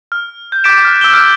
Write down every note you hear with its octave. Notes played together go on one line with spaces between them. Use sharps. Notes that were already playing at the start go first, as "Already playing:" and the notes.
F6
G6
D6 G6 A6 B6 D7 E7
F6 F#6
E6 G7
E6 F6 G6 D7